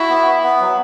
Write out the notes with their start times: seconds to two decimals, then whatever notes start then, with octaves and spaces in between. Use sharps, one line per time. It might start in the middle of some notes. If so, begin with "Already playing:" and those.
Already playing: E4 F#4
0.10 B3
0.27 B3
0.43 B3
0.61 F#3